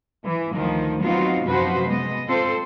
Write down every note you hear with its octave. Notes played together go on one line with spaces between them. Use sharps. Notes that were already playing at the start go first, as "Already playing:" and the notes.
E3
D2 D#3 F3
F#3 B3 C4 D#4 F4 F#4
F#2 C3 F3 F#4 B4 C5
G#3 B3 D#5
C4 F4 A4 C5